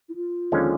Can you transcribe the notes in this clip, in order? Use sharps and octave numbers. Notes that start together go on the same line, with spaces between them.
E4
F4
D#2 D3 F3 G#3 C#4